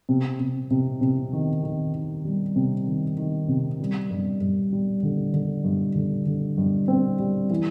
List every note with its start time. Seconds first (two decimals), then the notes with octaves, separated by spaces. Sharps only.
0.09 C3
0.40 C3
0.71 C3
1.01 C3
1.33 D#3
1.63 D#3
1.94 D#3
2.25 G3
2.56 C3
2.87 D#3
3.18 D#3
3.48 C3
3.80 G3
4.11 G2
4.41 G2
4.73 G3
5.03 D3
5.33 D3
5.64 G2
5.95 D3
6.26 D3
6.58 G2
6.88 C4
7.20 G3
7.50 E3